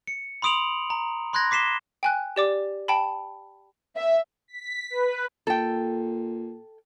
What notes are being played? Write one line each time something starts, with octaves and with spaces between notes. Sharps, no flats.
C#7
B5 C6 D#6 D7 F7 F#7
A#5
B5 C6 F#6 G#6 A#6
D6 B6 C7 E7 G7
G5 G#5 F#6
G4 D5 D6
G5 A5 B5
E5
B6
B4
A#2 A4 G5